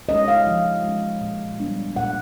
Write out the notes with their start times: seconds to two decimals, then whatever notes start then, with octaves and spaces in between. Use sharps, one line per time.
0.09 G#3 C#4 D#5
0.28 F5
0.47 F3
0.84 G#3 C#4
1.21 A#2
1.60 G3 B3 D4
1.96 A#2 F#5